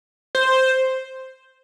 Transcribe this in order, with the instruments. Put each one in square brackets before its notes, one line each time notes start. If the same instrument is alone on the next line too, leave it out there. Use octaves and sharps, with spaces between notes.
[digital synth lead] C5